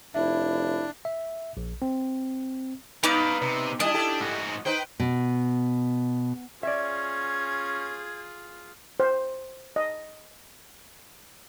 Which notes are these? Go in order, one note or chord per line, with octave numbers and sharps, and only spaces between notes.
F1 D4 E4 E5
E5
A#1
C4
B3 D#4 B4 D5 F5 D6
C3
G3 D4 E4 D#5
E4 G4 A4
G#2 F#4
D#4 B4 C5 G5
B2
C#4 F4 G#4 D5 E5 G#6
C5
D#5